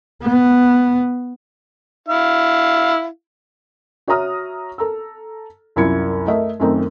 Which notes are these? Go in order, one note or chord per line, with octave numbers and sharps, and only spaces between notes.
B3
E4 F5
F#4 C#5 E5 A#5 D#6 F6
A4 A#5 E6
C2 F#2 E4 F4 G#6 C#7
A3 A#4 D#5 E5
F#2 D#3 A3 C4 D#4